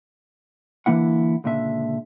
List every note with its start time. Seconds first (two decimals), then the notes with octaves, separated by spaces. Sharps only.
0.86 D3 E3 A#3 E4 F#5
1.44 C#2 A#2 D3 E5